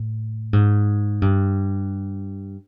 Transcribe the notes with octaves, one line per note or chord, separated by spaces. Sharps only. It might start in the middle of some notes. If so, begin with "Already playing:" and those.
Already playing: A2
G#2
G2